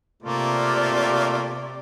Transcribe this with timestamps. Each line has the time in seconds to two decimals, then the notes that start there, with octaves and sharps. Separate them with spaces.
0.22 C3 A3 A#3 F4 D5